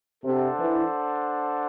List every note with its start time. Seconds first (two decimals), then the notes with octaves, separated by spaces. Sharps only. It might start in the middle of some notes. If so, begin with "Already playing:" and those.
0.23 C3 D4 A4 C5 F#5
0.58 E3